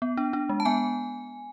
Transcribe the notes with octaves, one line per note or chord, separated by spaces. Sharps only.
B3
D4
D4
G#3
A5
B3 G#5